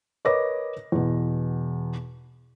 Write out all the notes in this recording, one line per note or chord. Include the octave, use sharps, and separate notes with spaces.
A#4 B4 C#5 D#5 D6 A#6
E2 B2